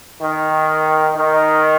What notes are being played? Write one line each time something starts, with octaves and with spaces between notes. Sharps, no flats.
D#3
D#3